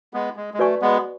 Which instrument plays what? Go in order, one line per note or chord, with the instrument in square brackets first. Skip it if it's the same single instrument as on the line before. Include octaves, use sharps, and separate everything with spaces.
[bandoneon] G#3 B3
G#3
G#3
[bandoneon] A3 [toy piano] F#4 B4 D5 G#5 C#6
[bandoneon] G#3 B3